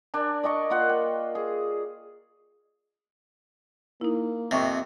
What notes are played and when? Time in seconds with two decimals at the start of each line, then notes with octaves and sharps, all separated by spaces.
0.14 D4 A#4 D5 G#5
0.43 D5 D#5 G#5 C#6
0.70 A#3 F4 F#5
0.89 G5
1.35 G#4
4.01 A#3 D#4 E4
4.51 F2 C3 E5 C#6